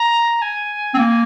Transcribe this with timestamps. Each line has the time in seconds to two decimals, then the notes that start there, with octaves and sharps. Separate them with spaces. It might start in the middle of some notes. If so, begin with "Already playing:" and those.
Already playing: A#5
0.41 G#5
0.94 C4
0.98 A#3